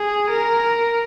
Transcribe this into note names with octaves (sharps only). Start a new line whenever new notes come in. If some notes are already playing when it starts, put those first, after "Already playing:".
Already playing: G#4
A#4